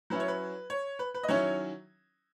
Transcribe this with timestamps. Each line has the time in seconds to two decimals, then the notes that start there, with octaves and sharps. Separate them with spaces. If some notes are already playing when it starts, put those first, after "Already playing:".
0.10 F#3 C#4 E4 B4
0.20 C#5
0.28 B4
0.70 C#5
0.99 B4
1.14 B4
1.23 D#5
1.28 D#3 F#3 C#4 E4 C#5